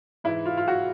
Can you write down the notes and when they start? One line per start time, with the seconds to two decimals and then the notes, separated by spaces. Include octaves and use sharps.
0.24 G#2 E3 E4
0.46 F4
0.57 F4
0.68 F#4